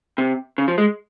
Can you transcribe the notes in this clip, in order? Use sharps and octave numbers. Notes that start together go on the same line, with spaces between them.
C3
C#3
F3
G#3